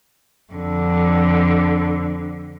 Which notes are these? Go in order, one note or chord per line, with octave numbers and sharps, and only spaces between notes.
F2 D3